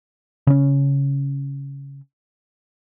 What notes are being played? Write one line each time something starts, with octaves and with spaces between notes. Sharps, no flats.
C#3 C#4